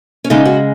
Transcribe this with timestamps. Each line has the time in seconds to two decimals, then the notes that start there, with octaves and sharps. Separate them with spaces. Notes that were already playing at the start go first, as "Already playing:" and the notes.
0.24 C#4
0.30 C#3 G#3 D#4
0.45 F#4